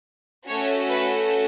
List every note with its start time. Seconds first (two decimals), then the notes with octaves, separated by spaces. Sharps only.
0.47 A3 C#4 F#4 A4 C#5
0.90 B4